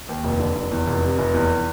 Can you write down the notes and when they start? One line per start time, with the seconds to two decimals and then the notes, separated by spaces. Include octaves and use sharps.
0.09 D#2
0.24 F1
0.40 D3
0.56 F1
0.72 E2
0.87 F1
1.03 C3
1.18 F1
1.34 E2